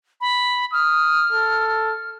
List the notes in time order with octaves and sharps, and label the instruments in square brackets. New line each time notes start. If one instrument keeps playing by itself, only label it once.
[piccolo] B5
[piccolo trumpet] D#6 [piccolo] F6
[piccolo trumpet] A4